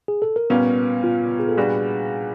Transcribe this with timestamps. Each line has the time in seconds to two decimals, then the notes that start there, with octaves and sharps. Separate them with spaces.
0.08 G#4
0.22 A4
0.36 A#4
0.50 A#2 G3 A#3 B3 C#4 B4
1.04 F4
1.39 G#4
1.49 A4
1.57 A#2 G3 B3 D4 F#4 G#4